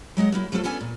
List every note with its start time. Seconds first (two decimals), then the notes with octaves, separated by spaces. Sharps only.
0.17 F#3 G#3 D#5 F#5
0.32 F#3 A#3 E4
0.52 F3 F#3 A3 F4 G4 A4
0.64 B3 C#4 D4 A4 G#5
0.81 A#2